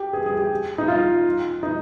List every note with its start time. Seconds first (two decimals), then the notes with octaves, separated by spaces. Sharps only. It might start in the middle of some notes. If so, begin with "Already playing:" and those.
Already playing: G4
0.13 G#4
0.26 G#4
0.39 G4
0.78 D#4
0.88 F4
1.63 D#4